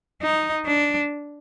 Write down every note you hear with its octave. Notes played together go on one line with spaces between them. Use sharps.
D#4
D4